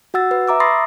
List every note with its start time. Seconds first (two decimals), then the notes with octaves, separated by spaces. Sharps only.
0.14 F#4 F#5 E6 A6
0.31 B4
0.48 E5 A#5 D6 E6
0.60 B5 C6 D#6 A6 A#6 C7